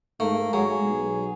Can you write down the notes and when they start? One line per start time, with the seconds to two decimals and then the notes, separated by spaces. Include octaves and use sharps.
0.20 G#2 A3 A#3
0.53 F#3 G#3 G#4
0.83 B1